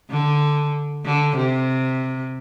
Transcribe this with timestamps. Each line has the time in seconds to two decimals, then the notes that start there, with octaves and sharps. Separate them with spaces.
0.10 D3
1.05 D3
1.36 C3